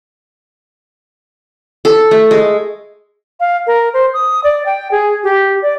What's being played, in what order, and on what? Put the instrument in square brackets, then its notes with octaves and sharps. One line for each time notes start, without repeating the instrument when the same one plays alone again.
[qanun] A4
A3
G#3
[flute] F5
A#4
C5
D#6
D5
G5
G#4
G4
D5